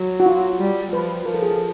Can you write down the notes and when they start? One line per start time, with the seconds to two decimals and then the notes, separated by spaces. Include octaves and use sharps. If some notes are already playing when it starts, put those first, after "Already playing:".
Already playing: F#3
0.20 F#4
0.26 F4
0.60 G3
0.92 F3 B4
1.26 F3 A#4
1.34 A4
1.43 G#4
1.51 A4